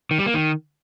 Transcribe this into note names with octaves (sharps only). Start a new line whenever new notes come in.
D#3
G3
A#3
D#3